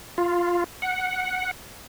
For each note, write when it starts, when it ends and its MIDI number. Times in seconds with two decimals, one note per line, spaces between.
0.18 0.64 65
0.82 1.51 78